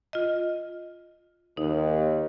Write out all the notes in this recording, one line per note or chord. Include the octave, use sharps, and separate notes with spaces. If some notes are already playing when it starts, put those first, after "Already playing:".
F4 D#5
D#2 D#4